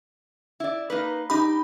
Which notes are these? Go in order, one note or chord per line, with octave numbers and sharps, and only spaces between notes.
E4 D5
A#3 D#4 B4
D#4 G4 B5